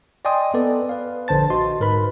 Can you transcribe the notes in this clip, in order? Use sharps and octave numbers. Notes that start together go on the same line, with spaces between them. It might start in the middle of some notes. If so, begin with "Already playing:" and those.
D5 D#5 G5 G#5 C6 D#6
B3 A4 B4 D5
B4 F5
A#1 D3 C5 A5 A6
F#4 D#5 C6
G#2 A#4 B4 B5